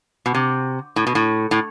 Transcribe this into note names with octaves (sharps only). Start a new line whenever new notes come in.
B2
C3
A2
B2
A2
A2